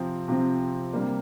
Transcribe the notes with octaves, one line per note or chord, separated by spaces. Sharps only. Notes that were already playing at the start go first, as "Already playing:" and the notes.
Already playing: C3 F3 C4
C3 F3 C4
C3 G3 A#3 D4